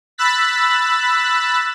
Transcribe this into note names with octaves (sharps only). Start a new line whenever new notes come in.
B5 E6 F#6 A6 B6